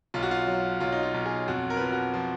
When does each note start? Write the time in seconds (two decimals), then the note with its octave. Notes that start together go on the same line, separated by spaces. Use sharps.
0.14 B1 F4
0.23 F#4
0.31 F4
0.47 F#3
0.80 B1 F4
0.92 D#4
1.03 F4
1.14 B1
1.26 G#4
1.48 F2 F#4
1.70 A#4
1.77 B4
1.80 F3 A#4
1.92 F#4
2.14 F3